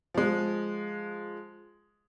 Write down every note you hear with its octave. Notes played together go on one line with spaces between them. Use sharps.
F3 G#3